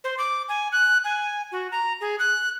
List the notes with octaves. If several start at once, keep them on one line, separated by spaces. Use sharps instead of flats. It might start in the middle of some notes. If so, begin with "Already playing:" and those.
C5
D6
G#5
F#6
G#5
F#4
A#5
G#4
F#6